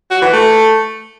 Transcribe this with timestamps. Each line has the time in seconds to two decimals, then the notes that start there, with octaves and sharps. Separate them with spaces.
0.11 F#4
0.22 E3
0.33 A3